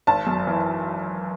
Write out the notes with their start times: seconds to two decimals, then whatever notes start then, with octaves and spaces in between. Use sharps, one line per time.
0.07 G#1 A5
0.27 F#2
0.47 E3